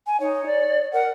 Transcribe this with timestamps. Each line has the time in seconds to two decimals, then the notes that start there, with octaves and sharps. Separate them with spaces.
0.07 G#5
0.20 D#4 C#5
0.46 D5
0.93 A#4 F#5